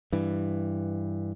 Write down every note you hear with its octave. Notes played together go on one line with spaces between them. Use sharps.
G2 E3